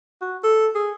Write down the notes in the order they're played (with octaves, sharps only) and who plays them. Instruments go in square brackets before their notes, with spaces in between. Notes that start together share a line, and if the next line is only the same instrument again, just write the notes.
[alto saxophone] F#4
A4
G#4